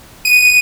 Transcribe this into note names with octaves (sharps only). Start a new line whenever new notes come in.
D#7